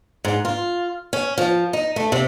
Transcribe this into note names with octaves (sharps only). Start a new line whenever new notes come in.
G#2
F4
C#4
F3
D#4
A3
C3